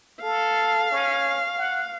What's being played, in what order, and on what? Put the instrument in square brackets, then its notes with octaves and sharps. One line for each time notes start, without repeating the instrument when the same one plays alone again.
[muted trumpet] A4 [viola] F5
[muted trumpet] C#4
F#5